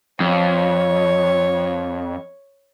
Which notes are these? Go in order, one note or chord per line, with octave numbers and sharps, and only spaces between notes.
F2 C#5